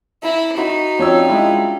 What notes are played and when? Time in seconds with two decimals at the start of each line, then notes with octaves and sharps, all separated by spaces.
0.23 E4 A#5
0.57 D#4 F#4 B5
0.99 F2 C#4 D4 C#5 G5 E6
1.28 G#3 E4 F4